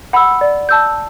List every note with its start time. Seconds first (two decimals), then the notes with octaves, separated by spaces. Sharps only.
0.13 F#5 B5 E6
0.41 D5
0.69 A5 E6 G6